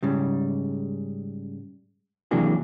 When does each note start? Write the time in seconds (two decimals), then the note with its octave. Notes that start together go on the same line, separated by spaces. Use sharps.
0.03 G#2 C#3 G3
2.31 C3 E3 F#3 A#3 D4 G#4